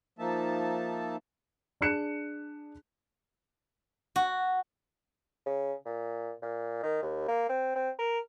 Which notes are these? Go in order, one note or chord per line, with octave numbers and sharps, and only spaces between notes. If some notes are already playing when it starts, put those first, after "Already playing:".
F3 A#3 D#4 E5 A5
D4 G#4 F#6 C#7 E7
F#4
C#3
A#2
A#2
D#3
D#2
A#3
C4
C4
A#4